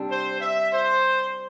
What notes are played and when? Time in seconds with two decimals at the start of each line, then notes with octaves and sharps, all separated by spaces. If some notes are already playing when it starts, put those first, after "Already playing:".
Already playing: C3 G3 D4
0.10 C5
0.41 E5
0.72 C5